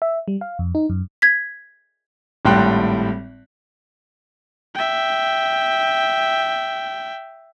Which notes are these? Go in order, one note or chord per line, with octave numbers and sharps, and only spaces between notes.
E5
G3
F5
F2
D#4
F#2
G#6 B6
G#1 A2 G3 G5 C6 F#6
E5 G5